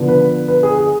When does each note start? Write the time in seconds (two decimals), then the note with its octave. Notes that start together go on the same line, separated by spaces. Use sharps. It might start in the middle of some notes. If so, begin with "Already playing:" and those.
Already playing: D3 F3 B3
0.08 B4
0.48 B4
0.63 G#4
0.78 G#4